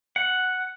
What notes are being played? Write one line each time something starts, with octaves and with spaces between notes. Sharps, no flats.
F#5